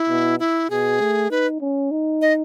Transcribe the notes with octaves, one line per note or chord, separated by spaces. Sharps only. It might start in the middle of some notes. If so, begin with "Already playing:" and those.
Already playing: E4
B2
E4
B2 G#4
A3
D#4 B4
C#4
D#4
D#5